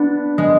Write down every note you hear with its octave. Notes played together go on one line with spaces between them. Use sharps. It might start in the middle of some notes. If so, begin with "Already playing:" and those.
Already playing: B3 D4
G#3